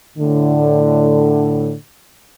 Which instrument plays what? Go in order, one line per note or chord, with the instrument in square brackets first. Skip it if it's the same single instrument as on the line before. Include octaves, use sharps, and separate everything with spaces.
[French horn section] A2 D3